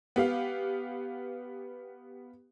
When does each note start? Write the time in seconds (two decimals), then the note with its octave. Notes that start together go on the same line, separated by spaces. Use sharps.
0.16 B3 G4 F5